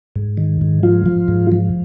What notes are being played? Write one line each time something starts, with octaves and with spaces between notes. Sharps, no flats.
G#2
D#3
G#2
F3 F4
F3
G#2
F3